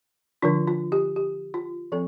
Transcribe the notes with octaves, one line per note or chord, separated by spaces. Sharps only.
D3 F3 D4 F4
F4
G4
G4
F4
F3 C4 A4